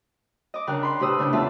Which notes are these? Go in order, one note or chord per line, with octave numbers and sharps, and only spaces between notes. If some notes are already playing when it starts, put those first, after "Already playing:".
D#5 D6
C#3 D4 A#4 G5 F#6
B5 C6
A2 C3 G4 B4 D#6 E6
C#3 D4 G6
E2 A3 F4 E5 A5